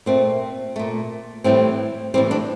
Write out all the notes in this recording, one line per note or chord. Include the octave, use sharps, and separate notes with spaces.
A#2 A3 C4
A#2 A3
A2 E3 G3 C4
A2 E3 G3 C4
D4